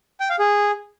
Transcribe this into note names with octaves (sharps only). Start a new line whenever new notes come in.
G5
F5
G#4